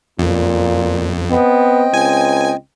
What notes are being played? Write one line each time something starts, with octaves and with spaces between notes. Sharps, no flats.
F2 A#2
B3 C4 D#5 G5
C#2 G#5